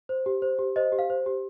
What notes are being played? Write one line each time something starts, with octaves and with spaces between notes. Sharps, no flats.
C5
G4
C5
G4
C5 D#5
G4
F5
C5
G4